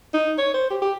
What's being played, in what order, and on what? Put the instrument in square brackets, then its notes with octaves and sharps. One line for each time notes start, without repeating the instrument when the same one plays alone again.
[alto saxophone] D#4
C#5
C5
G4
G4